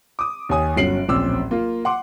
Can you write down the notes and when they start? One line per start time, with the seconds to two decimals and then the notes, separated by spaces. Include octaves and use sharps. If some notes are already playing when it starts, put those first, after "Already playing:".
0.19 D6 D#6
0.49 D#2 C#5 G#5 D#6
0.76 G1 F#3 C#4 C7 D7 F#7
1.08 D1 A#1 C4 C#4 D6 E6
1.51 A#3 F4
1.85 F#5 C6 D6